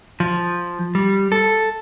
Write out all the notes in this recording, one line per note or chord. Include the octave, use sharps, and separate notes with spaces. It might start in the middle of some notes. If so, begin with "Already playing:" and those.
F3
G3
A4